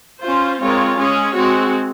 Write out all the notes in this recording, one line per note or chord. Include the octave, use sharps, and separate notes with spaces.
C#4 F4 C5
G#3 C4 F4 A#4 C#5
G#3 C#4 G#4 C#5
G#3 C4 F#4